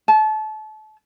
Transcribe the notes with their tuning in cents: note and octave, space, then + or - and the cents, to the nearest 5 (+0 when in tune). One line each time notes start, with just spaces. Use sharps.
A5 -30